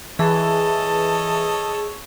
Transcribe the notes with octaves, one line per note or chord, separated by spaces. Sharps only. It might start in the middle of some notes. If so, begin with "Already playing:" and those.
E3 G#4 A4 C#5 D#5 A5